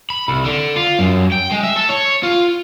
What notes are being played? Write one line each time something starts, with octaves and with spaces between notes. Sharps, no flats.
B5
C2
D3
F4
F#2
G5
G#3
E5
A4
C#5
F4